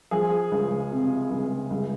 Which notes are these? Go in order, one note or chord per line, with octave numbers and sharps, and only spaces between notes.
F3 G#4
C#2
C3
C#2
C#2